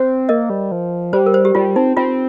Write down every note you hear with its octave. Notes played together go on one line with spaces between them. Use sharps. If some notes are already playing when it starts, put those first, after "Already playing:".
Already playing: C4 C5
A#3 A#4 D#5
G3
F3
G3 C5
A#4
C5
G4
G3 F4
C4 D#4
C4 F4